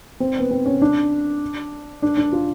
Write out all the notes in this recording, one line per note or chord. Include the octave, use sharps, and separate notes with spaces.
C4
B3
C4
C#4
D4
D4
D4
F4